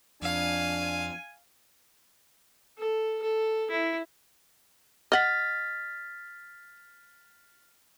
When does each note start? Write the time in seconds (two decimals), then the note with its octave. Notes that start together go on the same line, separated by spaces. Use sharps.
0.22 F2 D4 F5 G#5
2.79 A4
3.23 A4
3.71 E4
5.12 D#5 F#5 F6 A6 B6